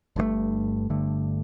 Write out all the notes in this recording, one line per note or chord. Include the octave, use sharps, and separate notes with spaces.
G1 G2 D3 A3
G1 G2 D3 A3